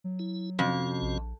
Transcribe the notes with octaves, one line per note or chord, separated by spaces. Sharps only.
F#3
E4
F2 C3 C#4 F#4
A#1